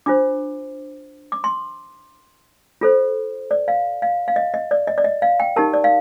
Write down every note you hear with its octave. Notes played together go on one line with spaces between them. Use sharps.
D4 F4 C5 D6
D6
C6
F4 A4 C5
D5
F5
F5
F5
D#5
D#5
D5
D#5
D5
D#5
F5
G5
D#4 G4 A#4 A5
D5
F5